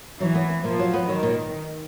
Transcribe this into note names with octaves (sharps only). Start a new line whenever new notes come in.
E3 F#3
B3
B3
A#2 F3
F#3
B3
D#3 F#3
A#2